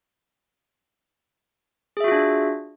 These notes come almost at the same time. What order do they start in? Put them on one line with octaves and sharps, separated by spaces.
G#4 E5 F#4 F4 D4